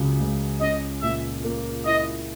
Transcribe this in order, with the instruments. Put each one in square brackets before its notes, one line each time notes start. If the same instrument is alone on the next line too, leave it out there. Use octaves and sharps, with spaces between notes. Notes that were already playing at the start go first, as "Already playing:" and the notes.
Already playing: [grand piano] C#2 C#3 F#3
C#2
[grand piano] C#4 [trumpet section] D#5
[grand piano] A#2 [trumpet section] E5
[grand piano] A#3
[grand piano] E4 [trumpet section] D#5